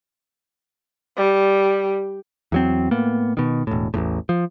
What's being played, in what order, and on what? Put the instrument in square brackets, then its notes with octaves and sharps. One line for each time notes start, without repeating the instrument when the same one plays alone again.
[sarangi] G3
[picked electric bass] E2 F#3 C4
A2 A#3 B3
B2 D#3
E1 A2
A1 E2 A2
F3